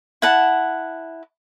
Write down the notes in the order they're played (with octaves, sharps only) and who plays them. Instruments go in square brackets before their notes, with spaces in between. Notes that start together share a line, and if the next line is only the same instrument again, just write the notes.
[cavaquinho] E4 F#5 A5